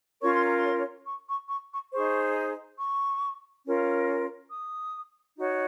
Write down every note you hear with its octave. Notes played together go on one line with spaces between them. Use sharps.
C#4 F4 A#4 C#5 C#6
C6
A#5
C6
C#6
C#6
C#6
C#6
D#4 G#4 C5 C#6
C#6
C#4 F4 A#4
D#6
D#4 F#4 C#5